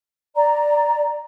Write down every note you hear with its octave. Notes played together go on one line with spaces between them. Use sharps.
D5 A#5